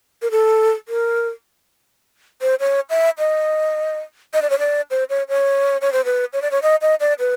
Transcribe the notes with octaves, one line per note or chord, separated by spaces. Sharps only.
A#4
A4
A#4
C5
C#5
E5
D#5
D#5
D5
C#5
D5
C5
C#5
C#5
C#5
C5
B4
C#5
D5
C#5
D#5
D#5
D5
B4